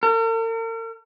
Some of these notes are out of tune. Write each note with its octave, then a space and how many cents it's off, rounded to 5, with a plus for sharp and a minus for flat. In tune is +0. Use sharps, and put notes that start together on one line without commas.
A#4 -45